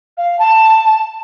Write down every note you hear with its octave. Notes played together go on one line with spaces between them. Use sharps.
F5
A5